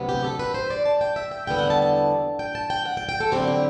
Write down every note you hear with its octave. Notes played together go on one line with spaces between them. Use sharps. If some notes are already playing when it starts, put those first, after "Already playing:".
Already playing: D2 C3 F#3 B3
G4
A4
B4
C5
D5
A5
G5
E5
G5
E2 D3 G3 B3 E4 G5
F#5
A5
A5
G5
A5
G5
F#5
G5
G5
A4
D3 F#3 C4 E4 G4
G4